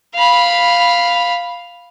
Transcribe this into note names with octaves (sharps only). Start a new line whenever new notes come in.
F5 B5